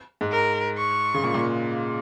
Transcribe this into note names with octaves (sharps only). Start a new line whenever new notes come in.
G#2
A#4
C#6
C#3
A#2
A#2